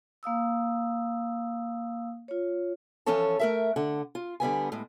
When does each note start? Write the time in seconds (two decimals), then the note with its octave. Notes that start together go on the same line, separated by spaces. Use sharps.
0.23 A#3 F5 D#6 E6
2.28 F4 C#5
3.06 E3 F3 C#4 A4 C#5 A5
3.39 A3 A#4 E5
3.76 D3 F#5
4.15 F4
4.40 D3 G3 B3 G#5
4.72 A2 G#3